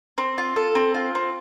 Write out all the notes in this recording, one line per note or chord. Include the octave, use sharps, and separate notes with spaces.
C4
F4
A4
C4
F4
C4